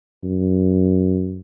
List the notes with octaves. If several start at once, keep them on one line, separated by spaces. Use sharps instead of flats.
F#2